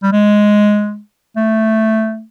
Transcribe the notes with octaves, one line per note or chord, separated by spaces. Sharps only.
G3
G#3
A3